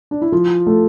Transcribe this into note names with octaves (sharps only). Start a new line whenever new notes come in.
D4
E4
F3 F4
A3 A4